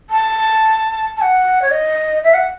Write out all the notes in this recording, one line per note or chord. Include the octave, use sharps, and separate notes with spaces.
A5
A5
F#5
C#5
D#5
E5
F#5